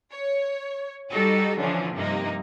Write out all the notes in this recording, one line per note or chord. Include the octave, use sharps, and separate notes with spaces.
C#5
G3 D#4 F#4 G4 A4
D3 E3 F3 C#4 D4
G2 C3 F3 A#3 D#4